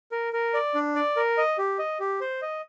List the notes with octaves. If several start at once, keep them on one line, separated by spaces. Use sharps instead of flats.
A#4
A#4
D5
D4
D5
A#4
D#5
G4
D#5
G4
C5
D#5